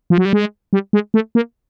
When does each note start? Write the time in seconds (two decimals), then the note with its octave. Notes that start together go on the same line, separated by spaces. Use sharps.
0.10 F3
0.18 F#3
0.25 G3
0.33 G#3
0.73 G3
0.93 G#3
1.14 A3
1.35 A#3